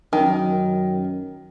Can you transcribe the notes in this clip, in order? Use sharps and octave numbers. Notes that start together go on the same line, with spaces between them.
F#2 D#3